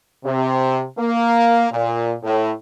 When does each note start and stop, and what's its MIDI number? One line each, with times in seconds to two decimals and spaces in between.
0.23 0.82 48
0.97 1.65 58
1.71 2.12 46
2.23 2.50 45